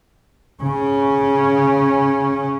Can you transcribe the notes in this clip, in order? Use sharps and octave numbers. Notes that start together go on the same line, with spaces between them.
C#3 C#4